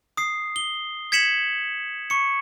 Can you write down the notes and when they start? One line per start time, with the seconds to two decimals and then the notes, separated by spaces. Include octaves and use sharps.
0.17 D#6 C7
0.56 G7
1.12 G#6 B6 C#7 E7 F#7
2.10 C#6 C#7